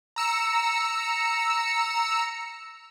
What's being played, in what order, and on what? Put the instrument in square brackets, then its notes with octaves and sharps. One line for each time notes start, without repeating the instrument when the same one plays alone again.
[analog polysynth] A#5 E6 C#7